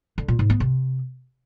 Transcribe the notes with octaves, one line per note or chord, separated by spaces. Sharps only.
D3
A#2
G#2
B3
C3